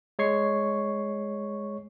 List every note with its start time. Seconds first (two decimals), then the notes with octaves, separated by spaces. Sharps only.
0.19 G#3 C#5 C#6 C7